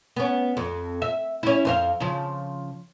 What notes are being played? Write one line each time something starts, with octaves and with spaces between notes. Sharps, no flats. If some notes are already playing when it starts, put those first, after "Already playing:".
B3 C#4
F2
E5
C#4 E4
F2 C5 F5
C#3 F3